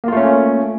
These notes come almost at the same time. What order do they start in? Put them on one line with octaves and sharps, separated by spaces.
A#3 F4 A3 C#4